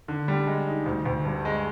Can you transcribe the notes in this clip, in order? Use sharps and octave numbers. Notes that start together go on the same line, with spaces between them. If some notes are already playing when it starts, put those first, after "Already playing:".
D3
G3
G#3
D#4
D2
D2
G2
G#3